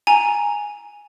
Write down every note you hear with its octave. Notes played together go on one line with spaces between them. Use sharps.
G#5 A#5